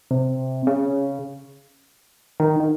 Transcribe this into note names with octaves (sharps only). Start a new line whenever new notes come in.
C3
C#3
D#3
D#3